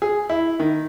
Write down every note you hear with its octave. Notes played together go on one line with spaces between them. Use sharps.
G#4
E4
D#3